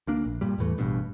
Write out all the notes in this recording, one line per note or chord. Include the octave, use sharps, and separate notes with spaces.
D2 A#3 D4
A#1
G2 A#2 G3
E2 A2 E3 A3
A1 G2 B2